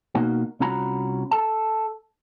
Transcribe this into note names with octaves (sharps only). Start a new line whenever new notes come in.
B2 A#3 D#4 F#4
C2 C#4 F4 F#4 A#5 B5
A4 A5